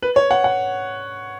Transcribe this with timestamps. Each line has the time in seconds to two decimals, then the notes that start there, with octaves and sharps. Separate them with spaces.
0.02 B4
0.16 C#5
0.31 F#5
0.44 F#5